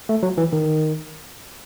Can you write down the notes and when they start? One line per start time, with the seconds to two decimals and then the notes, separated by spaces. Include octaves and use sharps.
0.09 A3
0.23 F#3
0.38 E3
0.53 D#3